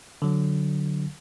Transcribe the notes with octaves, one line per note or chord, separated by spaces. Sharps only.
D3 F#3